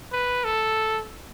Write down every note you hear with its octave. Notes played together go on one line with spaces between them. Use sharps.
B4
A4